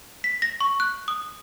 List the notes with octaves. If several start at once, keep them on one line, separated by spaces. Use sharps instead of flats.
B6
A#6
C#6
F#6
D#6